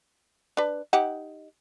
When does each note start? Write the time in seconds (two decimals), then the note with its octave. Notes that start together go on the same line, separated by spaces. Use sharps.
0.57 D4 B4
0.93 D#4 G4 F#5